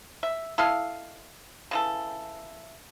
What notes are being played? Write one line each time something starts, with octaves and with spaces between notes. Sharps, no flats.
E5
E4 A4 D#5 F5
C#3 E3 A4